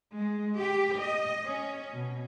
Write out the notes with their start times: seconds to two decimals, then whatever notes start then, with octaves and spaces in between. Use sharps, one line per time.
0.16 G#3
0.58 G4
0.99 D#5
1.46 C#4
1.94 B2